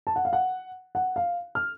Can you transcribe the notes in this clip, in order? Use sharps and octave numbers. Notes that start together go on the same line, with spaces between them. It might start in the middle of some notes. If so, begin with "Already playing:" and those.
A5
F#5
F5
F#5
F#5
F5
F6